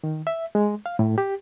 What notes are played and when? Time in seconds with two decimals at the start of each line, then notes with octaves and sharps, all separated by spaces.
0.04 D#3
0.27 E5
0.55 G#3
0.86 F5
0.99 A2
1.18 G4